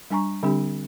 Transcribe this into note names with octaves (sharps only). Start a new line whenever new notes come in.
G3 D4 G#5 A#5 C#6
D3 G3 C4 D4 G4